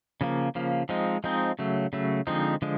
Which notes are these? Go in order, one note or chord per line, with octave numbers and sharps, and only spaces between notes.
C#3 F3 A#3
C#3 F3 A#3
F3 G#3 C4 D#4
F3 G#3 C4 D#4
C#3 F#3 A3
C#3 F#3 A3
D3 F3 G#3 C4 D#4
D3 F3 G#3